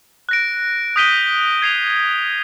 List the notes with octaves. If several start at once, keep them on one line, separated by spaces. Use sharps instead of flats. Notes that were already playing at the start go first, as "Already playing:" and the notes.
F#6 A#6 D7
D#6 G6 B6 D#7 G7
G#6 C7 F7